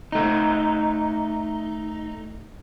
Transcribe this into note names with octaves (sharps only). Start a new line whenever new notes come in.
A3 D#4